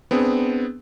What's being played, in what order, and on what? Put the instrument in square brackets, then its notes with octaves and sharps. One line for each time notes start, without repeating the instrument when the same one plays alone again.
[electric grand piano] B3 C4 D4 G#4